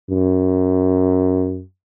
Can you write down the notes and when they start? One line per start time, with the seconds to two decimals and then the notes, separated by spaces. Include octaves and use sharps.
0.10 F#2